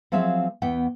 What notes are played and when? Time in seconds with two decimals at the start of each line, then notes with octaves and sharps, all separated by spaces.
0.12 F3 F#3 C4 G#4 E5 F5
0.62 E2 B3 F#5 G5